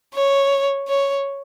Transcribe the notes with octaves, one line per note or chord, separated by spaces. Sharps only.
C#5
C#5